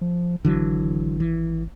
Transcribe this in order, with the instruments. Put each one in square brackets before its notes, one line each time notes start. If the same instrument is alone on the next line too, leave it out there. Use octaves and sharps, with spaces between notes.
[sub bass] F3
[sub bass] G#1 [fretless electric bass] D3 E3 F#3
[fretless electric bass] E3